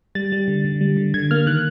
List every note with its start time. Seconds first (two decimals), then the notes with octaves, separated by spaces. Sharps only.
0.15 G3 A6
0.32 G3
0.48 D3
0.65 D3
0.81 G3
0.97 D3
1.14 D3 G#6
1.31 A#3 F6
1.46 D#3 F#6